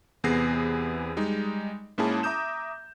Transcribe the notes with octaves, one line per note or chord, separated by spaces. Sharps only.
E2 C3 B3 G#4 A#6 C7
G3 G#3 D#4
G#2 A#3 C#4 E4 G#4 A5
E5 A#5 D6 D#6 G6 E7